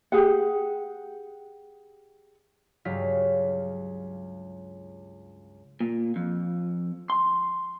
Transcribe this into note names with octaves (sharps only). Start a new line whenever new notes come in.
G4 G#4 F#5
C#2 G2 F#3 G4 F5 B6
A#2
F2
C6